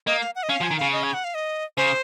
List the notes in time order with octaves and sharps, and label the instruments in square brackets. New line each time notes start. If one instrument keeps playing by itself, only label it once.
[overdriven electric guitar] A#3 [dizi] D#5
[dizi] F5
F#5
D#5
[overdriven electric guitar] C#4 [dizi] F5
[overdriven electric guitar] F3 [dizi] G#5
[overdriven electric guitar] D#3
[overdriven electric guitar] C#3 [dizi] F5
[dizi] D#5
G#5
F#5
F5
D#5
[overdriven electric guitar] C#3 [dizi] C5